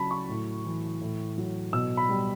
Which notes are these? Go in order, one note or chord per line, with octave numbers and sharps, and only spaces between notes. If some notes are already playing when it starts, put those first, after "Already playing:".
Already playing: C#3 F#3 A5 B5
C#6
A2
E3
A2
F#3
B2 E6
B5
G3